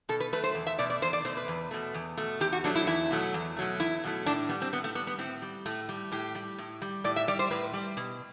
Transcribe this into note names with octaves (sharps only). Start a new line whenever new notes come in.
B2 A4
B4
F#3 A3 B4
C5
E2
E5
B2 A3 D5
D5
E2 C5
D5
B2 A3 C5
B4
E2
B2 A3
E2
B2 A3
E2 G4
F#4
B2 F#3 A3 D4
E4
E2 E4
B2 F#3 A3
E2
B2 F#3 A3
E2 E4
B2 F#3 A3
A2 D4
G3 B3
C4
A2 B3
A3
G3 B3
B3
A2 C4
G3
A2 A3
G3
A2 G4
G3
A2
G3
A2 D5
E5
G3 D5
C5
A2 B4
G3
B2